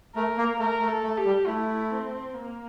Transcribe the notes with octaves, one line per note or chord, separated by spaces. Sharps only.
A3 A#4
A#3
A3 A#4
A3
A4
A3
G4
G3
A3 E4
C4
A#3